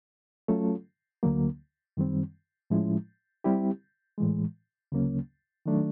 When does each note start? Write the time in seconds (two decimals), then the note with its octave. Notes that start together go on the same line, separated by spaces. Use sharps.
0.48 F#3 A3 C#4 F4 A4
1.23 D2 D3 F#3 A#3
1.97 F#2 D#3 G3 C4
2.70 A2 F3 G#3 C#4 E4
3.44 G3 C4 E4 G4
4.18 A2 E3 G#3
4.92 D2 C#3 F#3 A#3 C#4
5.66 D#3 F#3 A3 D4